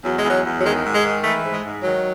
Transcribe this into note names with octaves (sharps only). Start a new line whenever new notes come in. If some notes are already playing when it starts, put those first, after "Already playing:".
E2 F#3
G#3
E2
F#3
E2
F#3
D#3 G#3
G#2
G#3
D#3
E3 A3
G#2
G#3
G#2
D#3 F#3